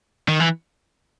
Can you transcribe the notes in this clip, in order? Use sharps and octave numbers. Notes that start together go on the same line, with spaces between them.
D#3
E3